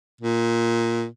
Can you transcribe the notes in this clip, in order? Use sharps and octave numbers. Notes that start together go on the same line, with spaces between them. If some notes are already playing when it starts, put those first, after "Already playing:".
A#2